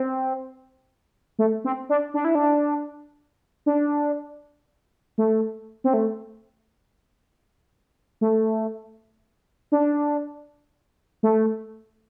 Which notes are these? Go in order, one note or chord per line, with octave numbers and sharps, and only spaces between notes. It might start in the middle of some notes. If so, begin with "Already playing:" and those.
Already playing: C4
A3
C4
D4
D4
E4
D4
D4
A3
C4
A3
A3
D4
A3